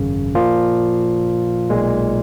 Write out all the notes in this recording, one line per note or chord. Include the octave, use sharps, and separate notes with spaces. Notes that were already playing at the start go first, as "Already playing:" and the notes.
Already playing: G#1 F#2 C#3
A#2 F3 A#3 F4
B1 A#2 G#3